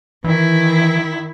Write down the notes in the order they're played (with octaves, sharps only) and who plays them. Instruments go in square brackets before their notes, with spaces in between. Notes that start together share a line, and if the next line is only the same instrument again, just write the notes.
[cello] D#3 E4 [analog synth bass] E3